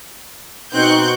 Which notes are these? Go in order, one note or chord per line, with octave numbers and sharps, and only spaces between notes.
B2 C4 D#4 C#6 F#6 G6